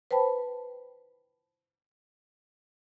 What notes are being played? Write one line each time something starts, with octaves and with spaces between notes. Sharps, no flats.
B4 C5 G5 A5 B5